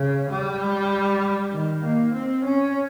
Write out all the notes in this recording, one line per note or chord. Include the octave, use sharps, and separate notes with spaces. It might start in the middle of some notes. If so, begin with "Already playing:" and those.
Already playing: C#3
G3
D#3
A#3
C4
C#4